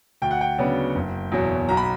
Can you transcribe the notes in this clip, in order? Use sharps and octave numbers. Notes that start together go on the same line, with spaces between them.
D2 G5
F#5
G5
C#3 F#3 B3 D4
F#1
E2 B2 F#3
B1 A#5
B5